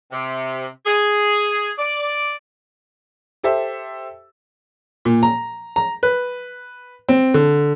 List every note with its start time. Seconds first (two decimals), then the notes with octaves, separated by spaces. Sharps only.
0.12 C3
0.86 G#4
1.78 D5
3.43 G4 A4 C5 E5
5.05 A#2
5.23 A#5
5.76 A#5
6.03 B4
7.09 C4
7.34 D3